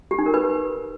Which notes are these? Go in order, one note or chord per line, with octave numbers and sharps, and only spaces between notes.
G4
D#4
A#4
B4